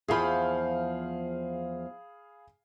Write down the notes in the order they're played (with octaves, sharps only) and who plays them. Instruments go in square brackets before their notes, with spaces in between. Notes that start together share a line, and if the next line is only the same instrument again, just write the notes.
[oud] E2 F3 [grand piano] G#4 F5 B5